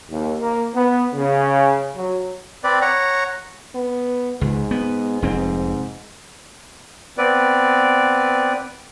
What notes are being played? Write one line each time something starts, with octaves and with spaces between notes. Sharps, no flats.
D#2
A#3
B3
C#3
F#3
C4 B4 D5
C#5 F#5 A#5
B3
C#2 G#2
B3
F1 G#2 C4
B3 C4 B4 D5